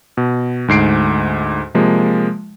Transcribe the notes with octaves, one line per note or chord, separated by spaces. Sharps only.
B2
D2 G#2 C7 D7
C3 F3 G#3 A#3